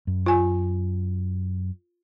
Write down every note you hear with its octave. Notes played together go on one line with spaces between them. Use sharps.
F#2
F4 G#5